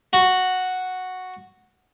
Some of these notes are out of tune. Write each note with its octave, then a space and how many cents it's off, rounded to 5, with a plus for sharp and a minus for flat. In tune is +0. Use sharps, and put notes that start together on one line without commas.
F#4 -5